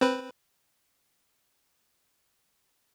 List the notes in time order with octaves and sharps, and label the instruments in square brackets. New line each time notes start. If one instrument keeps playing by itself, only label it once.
[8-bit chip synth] C4 B4